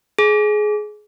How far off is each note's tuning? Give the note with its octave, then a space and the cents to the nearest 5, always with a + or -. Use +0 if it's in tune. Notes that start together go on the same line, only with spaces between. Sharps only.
G#4 +20